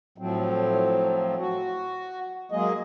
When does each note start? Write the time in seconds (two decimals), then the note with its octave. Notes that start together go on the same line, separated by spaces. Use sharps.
0.18 A2 F3 F#3 C4
1.38 F#4
2.52 F#3 G#3 A#3 G#4 D#5